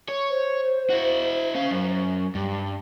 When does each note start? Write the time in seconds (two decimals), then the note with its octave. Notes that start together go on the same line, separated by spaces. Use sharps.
0.08 C#5
0.31 C5
0.90 E4 F#4
1.55 C#4 F5
1.71 F#2
2.35 G2